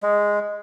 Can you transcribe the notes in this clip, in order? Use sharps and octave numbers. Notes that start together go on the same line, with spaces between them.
G#3